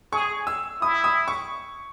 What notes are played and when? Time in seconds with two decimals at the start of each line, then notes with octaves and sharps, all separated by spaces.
0.13 G#4 C#6
0.47 E6
0.81 E4 D#6
1.04 D#6
1.28 C#6